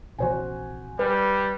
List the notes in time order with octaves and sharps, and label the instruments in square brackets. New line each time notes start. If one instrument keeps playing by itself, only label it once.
[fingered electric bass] A#1 C3 E3 [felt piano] F#4 C5 G#5
[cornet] G3 [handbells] B4